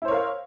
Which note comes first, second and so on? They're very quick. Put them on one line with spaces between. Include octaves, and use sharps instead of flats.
E4 C5 C#5 A#4 F5